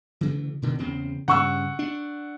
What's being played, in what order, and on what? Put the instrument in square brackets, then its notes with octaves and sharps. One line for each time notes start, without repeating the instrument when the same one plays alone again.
[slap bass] D2 C#3 E3
B2 D3 D#3
E2 C#3 C4
[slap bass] G2 C#3 [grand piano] F#5 C#6 E6
[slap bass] D4